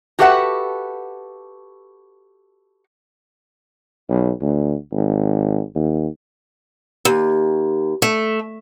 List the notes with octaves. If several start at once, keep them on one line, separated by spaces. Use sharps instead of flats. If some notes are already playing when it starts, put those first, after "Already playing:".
F#4 G4 A4 B4 E5 F#5
B1
D2
G#1
D#2
D#2
A3